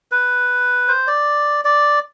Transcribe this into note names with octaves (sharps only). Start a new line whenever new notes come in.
B4
C5
D5
D5